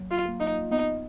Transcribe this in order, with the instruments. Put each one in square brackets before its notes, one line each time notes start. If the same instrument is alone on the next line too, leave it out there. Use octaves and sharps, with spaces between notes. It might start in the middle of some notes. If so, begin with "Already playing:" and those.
Already playing: [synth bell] F#3 A#3
[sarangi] F4
[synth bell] A#3 F4
[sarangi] D#4
[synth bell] B3 [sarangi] D#4